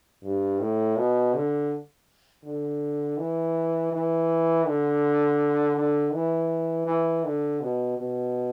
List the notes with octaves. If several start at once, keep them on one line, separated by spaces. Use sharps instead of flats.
G2
A2
B2
D3
D3
E3
E3
D3
D3
E3
E3
D3
B2
B2